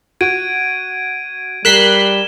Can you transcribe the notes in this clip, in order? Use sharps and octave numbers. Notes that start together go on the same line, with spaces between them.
F#4 G#6 D7 D#7
G3 A#4 F#6 B6 C7 E7 G7